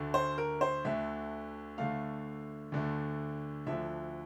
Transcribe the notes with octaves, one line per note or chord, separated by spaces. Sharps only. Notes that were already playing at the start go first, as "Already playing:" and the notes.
Already playing: D2 D3 A3
C5
A#4
C5
D2 D3 A3 E5
D2 D3 A3 F5
D2 D3 A3
D2 D3 F3 E5